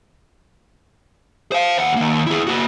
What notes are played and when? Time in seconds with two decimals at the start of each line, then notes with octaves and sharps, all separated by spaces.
1.52 C5 F5
1.79 D#2 F#5
1.96 D#3 A#3
2.27 E4 G#4
2.47 A#3 F#4